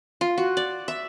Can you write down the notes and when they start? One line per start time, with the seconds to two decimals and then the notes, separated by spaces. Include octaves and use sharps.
0.21 F4
0.38 F#4
0.57 D5
0.88 E5